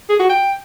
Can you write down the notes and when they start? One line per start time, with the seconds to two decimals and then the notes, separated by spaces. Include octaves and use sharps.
0.09 G#4
0.19 F#4
0.30 G5